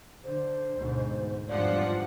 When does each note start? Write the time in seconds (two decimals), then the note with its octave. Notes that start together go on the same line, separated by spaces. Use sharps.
0.24 D3 C5
0.74 D2 G#2 B2
1.48 G#1 E2 G2 F3 D5 F#5